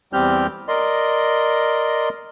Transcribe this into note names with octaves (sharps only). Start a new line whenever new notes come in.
E2 G3 C4 G4 F6 G6
A#4 D5 D#5 C6